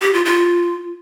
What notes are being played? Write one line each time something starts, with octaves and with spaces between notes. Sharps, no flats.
G4
F4
F4